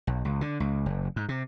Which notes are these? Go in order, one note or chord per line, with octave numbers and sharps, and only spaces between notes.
B1
C#2
D3
C#2
F#1
G#2
C3